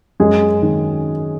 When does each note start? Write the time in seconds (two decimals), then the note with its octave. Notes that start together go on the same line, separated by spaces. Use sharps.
0.20 F#2 G#3 G#4
0.62 D#3